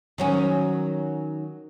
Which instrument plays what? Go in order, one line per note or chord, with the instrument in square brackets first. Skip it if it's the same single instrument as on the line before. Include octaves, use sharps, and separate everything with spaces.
[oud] D#3 F#3 C#4